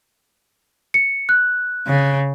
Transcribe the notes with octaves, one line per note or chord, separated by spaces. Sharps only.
C#7
F#6
C#3